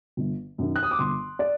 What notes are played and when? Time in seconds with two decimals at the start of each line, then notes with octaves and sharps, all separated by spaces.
0.17 G1
0.58 F#2 D#3
0.76 F#6
0.83 D#6
0.91 D6
0.99 G1 C6
1.39 D5